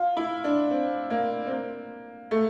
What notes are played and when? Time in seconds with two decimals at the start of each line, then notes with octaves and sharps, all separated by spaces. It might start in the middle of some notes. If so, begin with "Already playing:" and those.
Already playing: F4
0.17 E4
0.44 D4
0.71 C4
1.10 A#3
1.46 C4
1.51 A#3
2.31 A3